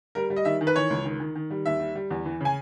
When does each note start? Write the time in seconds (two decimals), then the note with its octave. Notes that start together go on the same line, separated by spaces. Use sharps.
0.15 G3 A#4
0.30 G3
0.36 D#5
0.45 D#3 E5
0.61 D#3
0.67 B4
0.76 E3 C#5
0.90 C#2
1.05 D#3
1.20 D#3
1.35 D#3
1.51 G3
1.66 D#2 E5
1.80 G3
1.95 G3
2.10 E2
2.26 E3
2.41 C#3 G#5